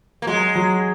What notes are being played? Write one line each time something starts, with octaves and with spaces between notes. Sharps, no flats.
A#3
F#3 G#3
F#3